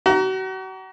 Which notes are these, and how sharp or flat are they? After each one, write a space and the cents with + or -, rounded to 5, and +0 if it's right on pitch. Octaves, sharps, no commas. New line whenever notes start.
F#4 +40 A#5 +0